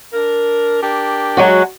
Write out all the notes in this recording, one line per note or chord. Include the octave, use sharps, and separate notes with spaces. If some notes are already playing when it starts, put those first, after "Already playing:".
D4 A#4
D4 G4 A#4
F#3 G#3 F#4